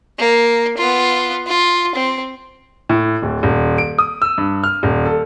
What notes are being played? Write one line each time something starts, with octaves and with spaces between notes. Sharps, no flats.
A#3
B3 F4
F4
C4
A2
D1
D#1
D7
D#6
E6
G2
F6
D#1
A4